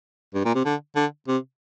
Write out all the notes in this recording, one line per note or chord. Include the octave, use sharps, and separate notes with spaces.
G2
A#2
C3
D3
D3
C3